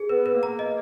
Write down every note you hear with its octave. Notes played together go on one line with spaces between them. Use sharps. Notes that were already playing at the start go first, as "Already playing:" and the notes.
Already playing: G#4
B3 B4
B4
A#3
A#5
D#5